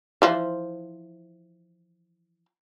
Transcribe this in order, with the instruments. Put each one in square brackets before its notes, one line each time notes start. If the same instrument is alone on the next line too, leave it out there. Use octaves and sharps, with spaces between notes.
[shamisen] E3 F3 C5